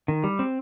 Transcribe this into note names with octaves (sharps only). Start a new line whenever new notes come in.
D#3
G3
C4